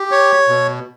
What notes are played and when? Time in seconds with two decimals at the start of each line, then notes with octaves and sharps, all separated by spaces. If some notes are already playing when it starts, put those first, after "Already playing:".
Already playing: G4
0.11 C#5
0.48 B2